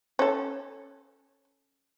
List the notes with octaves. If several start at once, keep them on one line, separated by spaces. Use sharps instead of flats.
C#4 A4